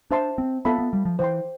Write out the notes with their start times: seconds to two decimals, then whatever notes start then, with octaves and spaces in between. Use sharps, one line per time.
0.11 D4 C5 E5 A5 C6
0.38 C4
0.65 B3 F4 A4 E5 B5
0.79 B3
0.93 G3
1.05 F3
1.19 E3 C5 G5 C6